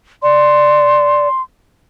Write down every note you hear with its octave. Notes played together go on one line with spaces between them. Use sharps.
D5 C6